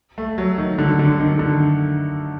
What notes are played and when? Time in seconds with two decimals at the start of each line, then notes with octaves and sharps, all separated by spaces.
0.18 A3
0.38 F#3
0.58 D#3
0.78 D3
0.99 D3
1.19 D#3
1.39 D3